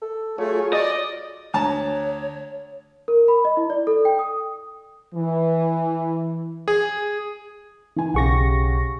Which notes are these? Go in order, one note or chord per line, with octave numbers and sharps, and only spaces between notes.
A4
F#3 A3 F4 G#4 C#5
D5 D#5
D2 C#5 A5 A#5
A#4
B5
D#5
E4
D5
A4
G5
D#6
E3
G#4
E3 G#5
B1 C#3 G4 F#5 C#6 A#6